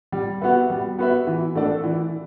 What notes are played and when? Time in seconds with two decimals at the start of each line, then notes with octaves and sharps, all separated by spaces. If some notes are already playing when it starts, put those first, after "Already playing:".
0.12 G3
0.41 B3 F#4 B4 E5
0.70 G3
0.98 B3 F#4 B4 E5
1.27 E3
1.55 A3 D4 A4 D5
1.84 E3